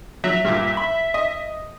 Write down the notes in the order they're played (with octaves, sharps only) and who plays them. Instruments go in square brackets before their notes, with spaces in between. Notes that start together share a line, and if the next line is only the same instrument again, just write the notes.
[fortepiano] F#3 [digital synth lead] E5
[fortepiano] G2 A#2
B5
D#5